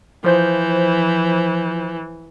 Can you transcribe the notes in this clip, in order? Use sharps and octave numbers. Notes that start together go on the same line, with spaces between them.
E3 F3 C5 G6